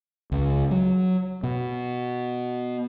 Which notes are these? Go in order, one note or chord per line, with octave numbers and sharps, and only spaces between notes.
C#2
F#3
B2